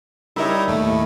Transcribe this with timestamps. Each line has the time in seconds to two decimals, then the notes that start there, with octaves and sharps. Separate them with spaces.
0.36 G3 D#4 E4 A#4 C#5 E5
0.68 D#2 A2 A3